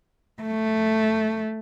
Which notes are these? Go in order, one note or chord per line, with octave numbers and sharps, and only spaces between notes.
A3